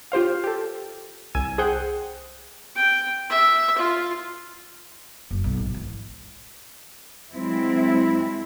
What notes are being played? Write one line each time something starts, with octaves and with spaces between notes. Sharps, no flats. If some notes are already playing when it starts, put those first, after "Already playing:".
F4 G4 C5 F5
G4 A4
C2 G#5 E6 G#6 D#7
G#4 C5 F#5 G5
G5
E5
F4
F#1
B1
G#1
E3
F#3 G#3 C4 E4